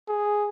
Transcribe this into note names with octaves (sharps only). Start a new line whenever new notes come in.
G#4